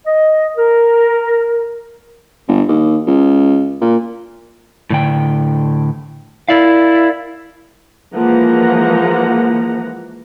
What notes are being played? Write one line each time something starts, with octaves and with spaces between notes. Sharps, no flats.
D#5
A#4
G1
D#2
C#2
A#2
A2 D3 G5
E4 A#4 D5 F5
E3 F3 G#3 A#3 F#5 A#5